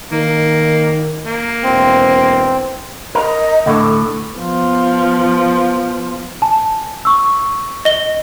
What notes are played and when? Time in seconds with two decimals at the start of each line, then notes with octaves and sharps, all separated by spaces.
0.12 D#3 A#3
1.27 A#3
1.63 E1 C4
3.15 A#4 D#5
3.66 D2 A2 D3 A4
4.36 F3 B3
6.42 G#5 A5
7.05 C#6 E6
7.85 D#5 G7